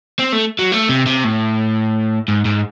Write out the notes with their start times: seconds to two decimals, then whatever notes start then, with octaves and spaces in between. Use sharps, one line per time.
0.19 C4
0.33 A3
0.59 F#3
0.72 A3
0.89 C3
1.06 C3
1.24 A2
2.28 G#2
2.45 G#2